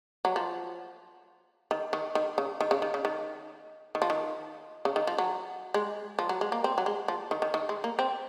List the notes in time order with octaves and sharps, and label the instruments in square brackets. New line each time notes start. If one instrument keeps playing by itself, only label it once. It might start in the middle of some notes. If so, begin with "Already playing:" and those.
[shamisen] F#3
F3
D#3
D#3
D#3
C#3
D#3
C#3
D#3
C#3
D#3
D#3
F3
D#3
C#3
D#3
F3
F#3
G#3
F3
F#3
G#3
A#3
C4
F#3
G#3
F3
D#3
D#3
D#3
G#3
A#3
C4